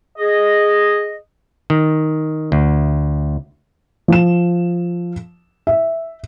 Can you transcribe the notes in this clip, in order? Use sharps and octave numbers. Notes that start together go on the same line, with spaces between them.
G#4 D#5
D#3
D2
F3 E7
E5